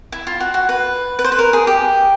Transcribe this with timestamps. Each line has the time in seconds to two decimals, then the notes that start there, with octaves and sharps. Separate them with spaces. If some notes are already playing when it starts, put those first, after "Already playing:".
0.12 E4
0.27 F4
0.40 F#4
0.54 F#4
0.69 B4
1.19 B4
1.24 C5
1.32 B4
1.39 A#4
1.53 G#4
1.67 G4